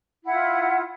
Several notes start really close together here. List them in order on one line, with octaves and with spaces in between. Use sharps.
E4 F#5 F4